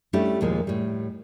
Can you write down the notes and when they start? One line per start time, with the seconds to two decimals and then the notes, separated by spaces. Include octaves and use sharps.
0.13 G3 A3 C#4 D4 E4 G4
0.41 D#2 A#2 F3 G#3 A#3
0.67 A2 G3